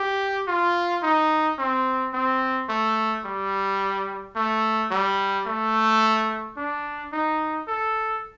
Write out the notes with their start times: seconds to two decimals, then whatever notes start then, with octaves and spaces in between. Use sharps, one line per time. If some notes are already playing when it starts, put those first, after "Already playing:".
Already playing: G4
0.48 F4
1.03 D#4
1.59 C4
2.13 C4
2.69 A3
3.25 G3
4.36 A3
4.91 G3
5.46 A3
6.57 D4
7.13 D#4
7.68 A4